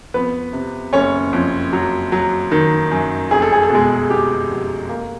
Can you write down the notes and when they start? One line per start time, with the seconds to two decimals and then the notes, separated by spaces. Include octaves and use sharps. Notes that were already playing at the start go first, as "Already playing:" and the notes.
0.14 F2 B3 B4
0.53 C3
0.93 F#1 C#4 C#5
1.33 F2
1.73 F#3
2.12 F#3
2.52 D#3
2.91 F#2
3.31 F1 G#4
3.42 A4
3.52 G#4
3.63 A4
3.70 B2 G#3 G#4
4.10 B2 G4
4.50 F1
4.89 A#3